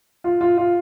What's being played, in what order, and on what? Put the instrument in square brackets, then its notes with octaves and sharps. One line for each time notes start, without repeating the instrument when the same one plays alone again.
[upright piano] F4
F4
F4